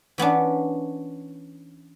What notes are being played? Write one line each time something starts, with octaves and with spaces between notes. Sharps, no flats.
E3 B3 C#4 D4